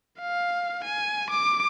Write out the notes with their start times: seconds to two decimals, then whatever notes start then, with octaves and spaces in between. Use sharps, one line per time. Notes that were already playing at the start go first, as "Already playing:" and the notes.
0.20 F5
0.84 G#5
1.31 D6